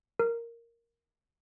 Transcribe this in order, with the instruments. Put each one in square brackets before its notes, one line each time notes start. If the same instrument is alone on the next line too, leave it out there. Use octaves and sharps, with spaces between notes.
[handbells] A#4